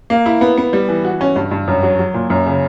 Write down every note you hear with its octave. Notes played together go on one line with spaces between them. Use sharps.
A#3
E4
B3
B3
G3
E3
F#4
C#4
G2
G2
F#2
F#3
F#3
A#2
F#2
C#3